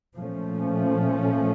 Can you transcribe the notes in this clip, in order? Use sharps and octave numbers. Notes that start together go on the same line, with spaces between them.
A#2 F3 A3 C#4